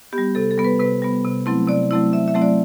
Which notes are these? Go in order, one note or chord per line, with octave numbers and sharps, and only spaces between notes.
B3 G4
G3
C3 A4
A4
G3 B3
B4
C3 B4
G3 B3
C3
F#3 A3 C4 E4
C3 D5
F#3 A3 C4 E4
C3 E5
E5
F#3 A3 C4 E4
D5